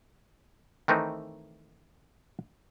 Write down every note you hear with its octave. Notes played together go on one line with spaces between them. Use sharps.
D#3 E3 A3 C4 D#4